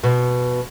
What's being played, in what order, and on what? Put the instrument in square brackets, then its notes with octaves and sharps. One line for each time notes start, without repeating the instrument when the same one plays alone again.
[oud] B2